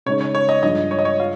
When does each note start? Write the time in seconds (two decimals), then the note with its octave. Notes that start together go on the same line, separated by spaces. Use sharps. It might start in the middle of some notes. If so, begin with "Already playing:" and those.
0.06 C#3 G#3 D#4 C#5
0.21 C#5
0.35 C#5
0.49 D#5
0.62 G2 F3 G#3 D#5
0.91 C#5
0.99 D#5
1.05 C#5
1.20 F4